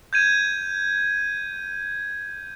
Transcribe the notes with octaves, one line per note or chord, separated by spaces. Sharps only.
G6 G#6 D#7